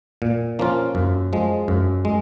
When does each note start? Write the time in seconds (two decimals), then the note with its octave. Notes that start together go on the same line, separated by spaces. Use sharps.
0.22 A#2
0.59 F3 A#3 C#4 F4
0.95 F#2
1.33 F3 G#3
1.68 F#2
2.05 G#3